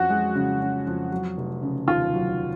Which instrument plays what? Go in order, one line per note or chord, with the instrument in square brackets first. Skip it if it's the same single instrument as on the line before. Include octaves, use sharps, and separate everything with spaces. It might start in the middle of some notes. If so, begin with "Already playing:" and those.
Already playing: [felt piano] F2 C#4 [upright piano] F#4
[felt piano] G#3
C#3
C#4
F2
F#3
F1
C#3
[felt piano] D#2 [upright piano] F4
[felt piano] F#3